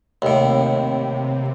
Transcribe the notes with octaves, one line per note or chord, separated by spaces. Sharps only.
D#2 A2 C3